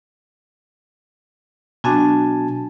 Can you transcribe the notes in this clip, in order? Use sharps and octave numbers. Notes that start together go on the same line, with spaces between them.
B2 F#3 D4 F#4 G#5 A5